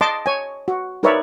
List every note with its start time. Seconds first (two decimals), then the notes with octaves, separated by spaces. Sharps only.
0.01 D#5 A5 C6 D6
0.26 C#5 G#5
0.68 F#4
1.03 D#4 A#4 B4 C#5 D5 E5